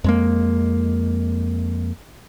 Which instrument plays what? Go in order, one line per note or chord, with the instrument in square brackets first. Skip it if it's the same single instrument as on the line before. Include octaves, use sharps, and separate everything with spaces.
[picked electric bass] F2 G#3 A#3